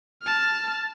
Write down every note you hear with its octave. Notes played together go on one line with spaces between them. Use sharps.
A5 F6